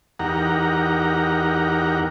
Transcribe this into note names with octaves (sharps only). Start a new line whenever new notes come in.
E2 D#4 G4 A#4 F#5 A#5